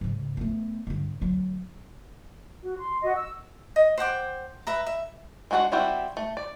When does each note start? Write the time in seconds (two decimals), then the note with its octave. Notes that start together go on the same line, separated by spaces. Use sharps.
0.01 G#2 C#3
0.37 A3 B3
0.87 G2 D3
1.21 D2 F#3
2.63 F#4
2.78 C6
3.03 F#4 D#5
3.15 E6
3.76 D#5
3.98 C5 F#5 G5 D6
4.67 B4 E5 A#5
4.86 E5
5.51 G#3 D4 F#4 A4 F#5
5.72 G3 C4 E4 F#4 G4
6.17 A3
6.37 D5